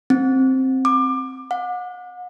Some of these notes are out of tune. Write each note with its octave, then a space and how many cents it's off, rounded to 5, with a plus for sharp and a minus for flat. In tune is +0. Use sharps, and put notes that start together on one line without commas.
C4 +5
D6 +25
F#5 -40